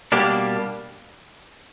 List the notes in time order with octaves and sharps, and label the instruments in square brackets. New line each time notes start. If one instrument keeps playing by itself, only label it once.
[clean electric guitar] B2 G3 A#3 D4 G4